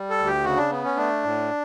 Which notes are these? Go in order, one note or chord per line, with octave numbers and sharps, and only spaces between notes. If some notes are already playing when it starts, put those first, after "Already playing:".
Already playing: G3
A4
D2
G4
C#3 F#4
D4
B3
C#4
A3 D4
A2